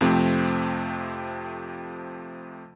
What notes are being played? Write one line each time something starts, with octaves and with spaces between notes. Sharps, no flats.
F2 C3 F3 A3 C4